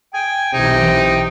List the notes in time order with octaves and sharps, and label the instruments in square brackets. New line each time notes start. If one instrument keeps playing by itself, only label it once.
[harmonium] G5 [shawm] G#5
[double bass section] B1 E3 [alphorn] C3 [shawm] D#4